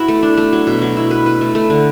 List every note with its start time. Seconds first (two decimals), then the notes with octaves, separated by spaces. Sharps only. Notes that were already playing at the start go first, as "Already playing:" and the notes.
Already playing: B3 E4 F#4
0.08 A3
0.23 D4
0.38 A3
0.53 F#3
0.67 B2
0.82 F#3
0.97 E4
1.11 B4
1.26 B4
1.41 A3
1.55 A3
1.70 D3